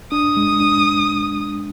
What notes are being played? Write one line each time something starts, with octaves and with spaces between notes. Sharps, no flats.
D4 D#6
G#3
D4